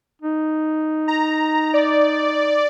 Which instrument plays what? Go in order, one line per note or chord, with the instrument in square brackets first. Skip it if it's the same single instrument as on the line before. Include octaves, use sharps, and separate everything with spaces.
[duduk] D#4
[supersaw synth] A#5
D5